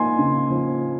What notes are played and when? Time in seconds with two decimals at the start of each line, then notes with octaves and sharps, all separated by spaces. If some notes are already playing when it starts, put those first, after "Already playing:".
Already playing: F3 A#3 D#4 G#5 C6
0.18 C#3
0.50 F3